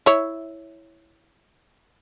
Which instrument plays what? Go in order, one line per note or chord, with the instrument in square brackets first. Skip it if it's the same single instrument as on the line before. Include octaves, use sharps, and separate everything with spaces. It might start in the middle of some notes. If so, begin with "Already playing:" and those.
[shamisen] E4 C#5